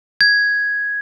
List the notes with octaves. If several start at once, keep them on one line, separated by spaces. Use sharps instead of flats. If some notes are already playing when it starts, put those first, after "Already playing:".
G#6